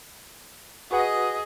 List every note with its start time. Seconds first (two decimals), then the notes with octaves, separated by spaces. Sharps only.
0.91 F#4 G#4 B4 D#5 F#5